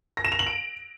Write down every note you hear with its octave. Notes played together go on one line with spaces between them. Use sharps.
A#6
E7
F7
F#7
D7